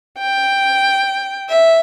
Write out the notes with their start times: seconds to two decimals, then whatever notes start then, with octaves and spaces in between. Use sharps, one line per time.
0.18 G5
1.49 E5